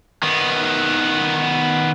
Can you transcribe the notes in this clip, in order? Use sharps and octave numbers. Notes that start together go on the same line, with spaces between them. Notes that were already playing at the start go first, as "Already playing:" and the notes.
D#3 B3